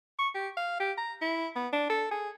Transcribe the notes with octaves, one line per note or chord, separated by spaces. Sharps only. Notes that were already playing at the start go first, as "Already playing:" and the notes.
C#6
G4
F5
G4
A#5
E4
B3
D4
A4
G#4